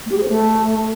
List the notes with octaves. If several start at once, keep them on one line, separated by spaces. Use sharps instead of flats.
A3
G4
G#4
C5
A3